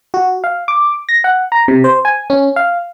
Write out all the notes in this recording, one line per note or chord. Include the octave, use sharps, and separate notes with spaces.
F#4
F5
D6
A#6
F#5
A#5
C3
C5
G#5
C#4
F5